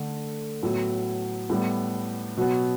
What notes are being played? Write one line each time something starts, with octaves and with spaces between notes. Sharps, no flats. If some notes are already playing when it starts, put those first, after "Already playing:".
Already playing: D3 A3
A2 F#3 B3
A2 G3 B3
B2 F#3 B3